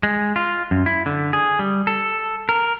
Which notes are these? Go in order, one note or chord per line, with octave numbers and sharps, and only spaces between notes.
G#3
F4
F#2
E4
D3
G#4
G3
A4
A#4